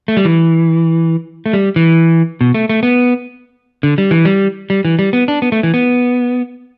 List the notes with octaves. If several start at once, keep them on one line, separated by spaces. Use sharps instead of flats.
A3
G3
E3
A3
G3
E3
B2
A3
A3
B3
D3
G3
E3
G3
G3
E3
G3
B3
D4
B3
A3
E3
B3